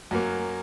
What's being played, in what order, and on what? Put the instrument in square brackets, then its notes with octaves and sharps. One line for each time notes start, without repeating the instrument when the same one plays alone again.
[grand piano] F#2 F#3 A#3